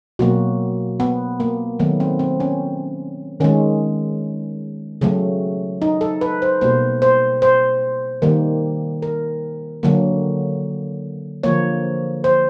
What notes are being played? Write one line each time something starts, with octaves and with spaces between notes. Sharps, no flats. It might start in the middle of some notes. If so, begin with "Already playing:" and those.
B2 F#3 A#3 F#4
B3
A#3
D#3 F#3 A3 B3
C4
C4
C#4
D#3 G#3 C#4
C#3 F#3 A3
D#4
A4
B4
C5
B2 G3 A#3 C5
C5
C5
D#3 G3 A#3
A#4
D3 F#3 A#3
D3 F3 A#3 C#5
C5